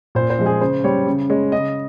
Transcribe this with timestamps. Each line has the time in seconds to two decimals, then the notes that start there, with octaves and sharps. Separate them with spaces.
0.15 A#2 C5
0.30 C5
0.39 F3 G#3
0.46 G#4
0.61 C#3 C5
0.84 G3 C#5
1.07 C#3
1.30 G#3 C#5
1.52 C#3 D#5